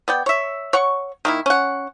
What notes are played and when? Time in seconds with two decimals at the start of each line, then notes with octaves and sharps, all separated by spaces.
0.08 B3 D5 G5
0.26 C#5 E5
0.73 C#5 F#5 C#6
1.25 D#3 A#3 E4
1.46 C#4 F#5